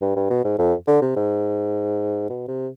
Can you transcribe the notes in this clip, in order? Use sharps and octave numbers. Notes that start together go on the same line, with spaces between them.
G2
G2
B2
G#2
F2
D3
C3
G#2
B2
C3